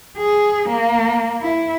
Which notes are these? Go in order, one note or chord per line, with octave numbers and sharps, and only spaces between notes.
G#4
A#3
E4